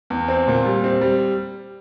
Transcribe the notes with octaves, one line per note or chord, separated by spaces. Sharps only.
E2
C4
A#2
G3
C4
G3